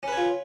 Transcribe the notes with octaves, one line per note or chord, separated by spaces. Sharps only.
C#4 F4 B4 C#5